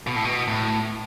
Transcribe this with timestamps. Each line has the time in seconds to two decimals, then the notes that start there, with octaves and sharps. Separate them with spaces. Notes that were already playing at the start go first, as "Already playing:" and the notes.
0.07 B2
0.16 A2
0.25 B2
0.48 A2